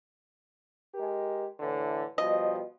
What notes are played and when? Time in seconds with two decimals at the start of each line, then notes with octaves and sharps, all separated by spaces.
0.95 G#3 G4 A#4
1.60 A2 D3 E3
2.18 B2 F3 G3 D#5